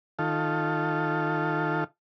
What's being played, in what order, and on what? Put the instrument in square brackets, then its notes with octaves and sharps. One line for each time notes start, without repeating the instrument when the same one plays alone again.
[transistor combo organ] D#3 F4 A4